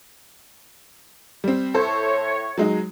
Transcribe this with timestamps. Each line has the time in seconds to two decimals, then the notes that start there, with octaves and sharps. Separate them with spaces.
1.44 G3 C4
1.74 A2 A4 C5 C#5
2.58 F#3 G#3 D#4